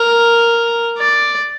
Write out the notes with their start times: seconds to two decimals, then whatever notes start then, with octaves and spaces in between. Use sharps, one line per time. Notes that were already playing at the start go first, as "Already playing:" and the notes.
Already playing: A#4
0.98 D5